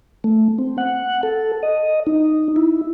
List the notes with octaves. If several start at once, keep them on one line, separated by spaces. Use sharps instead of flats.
A3
C4
F#5
A4
D#5
D#4
E4